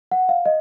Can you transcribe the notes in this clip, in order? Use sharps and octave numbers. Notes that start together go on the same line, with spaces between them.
F#5
F5
D#5